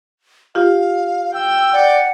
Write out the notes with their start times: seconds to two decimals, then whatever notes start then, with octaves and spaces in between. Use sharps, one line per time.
0.55 F4 G4 F5
1.34 G5 E6
1.73 D5 F#5